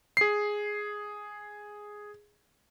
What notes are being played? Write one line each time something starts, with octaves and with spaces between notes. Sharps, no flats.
G#4 C7